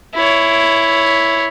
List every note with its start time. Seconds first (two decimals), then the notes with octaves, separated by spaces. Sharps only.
0.15 E4 C#5